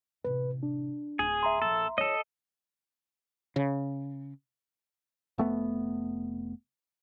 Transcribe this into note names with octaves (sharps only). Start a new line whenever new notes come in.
A1 C3 B4
D4
D1 G#4
E5 A#5 C6
A#1 A4
D#4 F4 A4 C#5 D#5
C#3
F1 A3 B3